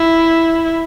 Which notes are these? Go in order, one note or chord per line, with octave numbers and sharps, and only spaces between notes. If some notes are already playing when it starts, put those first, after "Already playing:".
Already playing: E4